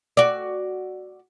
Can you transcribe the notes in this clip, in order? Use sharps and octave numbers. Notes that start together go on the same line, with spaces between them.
F#4 D5